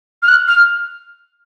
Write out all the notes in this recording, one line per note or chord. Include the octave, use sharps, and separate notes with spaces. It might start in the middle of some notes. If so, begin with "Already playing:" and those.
F6
F#6
F6